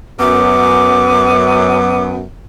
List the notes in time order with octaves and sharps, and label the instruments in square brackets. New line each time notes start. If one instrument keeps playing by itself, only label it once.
[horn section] F#2 [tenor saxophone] B3 [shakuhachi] D6